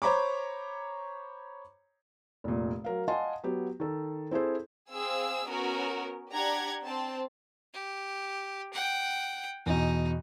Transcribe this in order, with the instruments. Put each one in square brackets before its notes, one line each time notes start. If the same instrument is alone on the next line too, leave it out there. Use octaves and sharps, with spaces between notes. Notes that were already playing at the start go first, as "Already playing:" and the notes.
[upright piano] C5 C#5 A#5 B5 C#6 D6
[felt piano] F1 A#2
F#3 A#4 F5
D#5 F5 F#5 G#5 A5 C6
F#3 B3 G4
D#3 A4
C4 E4 G#4 A4 C5
[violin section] C4 G#4 F5 E6
B3 C#4 F#4 A#4
D4 G4 F#5 A#5 G#6
C4 C5 A5
[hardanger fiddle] G4
F#5 G5
[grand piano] E2 B2 [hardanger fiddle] D#4